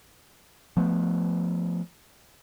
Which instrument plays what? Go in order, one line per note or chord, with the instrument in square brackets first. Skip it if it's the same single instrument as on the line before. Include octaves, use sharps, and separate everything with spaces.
[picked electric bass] F3 A3 B3